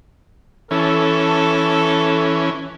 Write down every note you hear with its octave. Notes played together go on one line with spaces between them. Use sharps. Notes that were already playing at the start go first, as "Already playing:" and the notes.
E3 C#4 A4